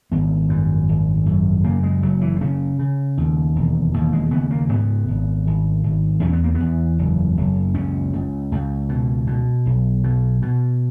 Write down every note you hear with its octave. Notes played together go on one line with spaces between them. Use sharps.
G#1 B3
F#2
G#1
F#2
C#3 A#3
G#3
F#1 F#3
E3
C#3 C#4
C#3
D#2
E1
D#2
G#3
C#3 B3
A#3
G#2 B3
G#1
G#1
G#1
E2 C#4
B3
A#3
B3
E2
F#1
F#1
C#2 C#4
C#2
C#2
B2
B2
B1
B2
B2